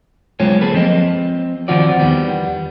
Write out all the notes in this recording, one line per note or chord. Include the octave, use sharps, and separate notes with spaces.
D3 F#3 G#3 C4 F4 C#5
A#3 G#4 A4 B4
F3 C4 D#5
D#3 F3 C4 F4 F#4 D5
E2 D#3 G3 B3